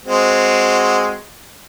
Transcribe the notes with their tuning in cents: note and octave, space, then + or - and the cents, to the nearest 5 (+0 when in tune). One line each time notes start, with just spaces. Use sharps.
G#3 +0 C4 +0 F#4 -5